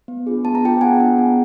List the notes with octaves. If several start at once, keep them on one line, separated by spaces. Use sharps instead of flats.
B3
D4 F4 G#4
B3 A5
A#5
D4 F4 G#4 G5 A5
B3 F#5 G#5
D4 F4 G#4
B3